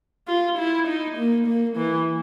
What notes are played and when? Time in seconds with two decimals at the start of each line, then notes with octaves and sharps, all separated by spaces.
0.28 F4
0.58 E4
0.87 D#4
1.18 A#3
1.47 A#3
1.77 E3